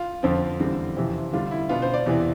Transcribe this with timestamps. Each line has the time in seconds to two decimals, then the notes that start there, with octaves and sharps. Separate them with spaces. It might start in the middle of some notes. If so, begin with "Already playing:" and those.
Already playing: F4
0.23 F2 D3 F3 C4
0.60 E2 D3 G3 C4
0.97 F2 C3 E3
1.33 D3 G3 D4 F4
1.51 E4
1.69 B2 B3 D4 F4
1.82 C5
1.94 D5
2.06 E2 C3 E3